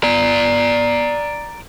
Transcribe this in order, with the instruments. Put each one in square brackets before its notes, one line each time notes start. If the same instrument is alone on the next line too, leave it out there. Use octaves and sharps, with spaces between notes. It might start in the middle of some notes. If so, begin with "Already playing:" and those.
[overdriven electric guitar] D5 A#5